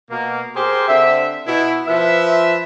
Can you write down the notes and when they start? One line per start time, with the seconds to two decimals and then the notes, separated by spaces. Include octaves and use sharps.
0.11 B2 A#3
0.56 G4 G#4 A#4 C5
0.88 D3 C4 E5
1.47 B2 E4
1.88 F3 B4 E5